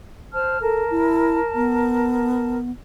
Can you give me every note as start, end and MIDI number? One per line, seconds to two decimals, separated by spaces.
0.33 0.60 72
0.33 0.60 81
0.33 0.60 89
0.61 0.84 69
0.61 2.56 70
0.61 2.56 81
0.90 1.40 64
1.55 2.71 59